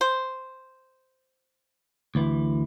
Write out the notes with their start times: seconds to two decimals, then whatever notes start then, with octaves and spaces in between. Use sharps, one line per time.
0.01 C5
2.15 D2 E3